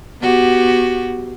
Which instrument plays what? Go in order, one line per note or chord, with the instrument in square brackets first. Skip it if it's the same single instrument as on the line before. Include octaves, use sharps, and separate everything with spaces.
[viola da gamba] B3 F#4 G4